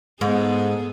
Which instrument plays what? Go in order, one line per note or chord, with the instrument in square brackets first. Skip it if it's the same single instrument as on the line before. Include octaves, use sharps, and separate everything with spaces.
[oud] G#2 [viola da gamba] B3 G#4 A4